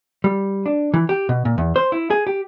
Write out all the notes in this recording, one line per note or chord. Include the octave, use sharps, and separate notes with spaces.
G3
D4
E3
G4
B2
A#2
E2
C5
E4
G#4
G4